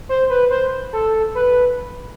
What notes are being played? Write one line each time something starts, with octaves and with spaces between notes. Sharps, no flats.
C5
B4
C5
A4
B4